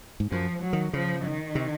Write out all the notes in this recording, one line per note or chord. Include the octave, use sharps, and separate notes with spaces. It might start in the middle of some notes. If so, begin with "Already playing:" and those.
G#2
F#2 F3
F#3
D#3
C#3 F3
D#3
C3